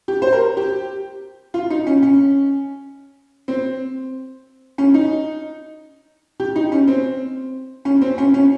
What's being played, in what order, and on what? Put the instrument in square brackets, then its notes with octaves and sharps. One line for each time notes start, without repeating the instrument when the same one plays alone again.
[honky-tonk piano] G4
C5
A#4
G4
F4
D#4
C#4
C#4
C4
C#4
D#4
G4
D#4
C#4
C4
C#4
C4
C#4
C#4